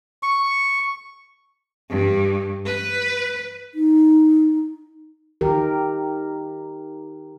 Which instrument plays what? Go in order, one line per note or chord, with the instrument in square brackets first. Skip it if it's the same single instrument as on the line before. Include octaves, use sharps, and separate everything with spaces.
[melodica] C#6
[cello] G2
B4
[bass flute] D#4
[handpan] D#3 G4 A#4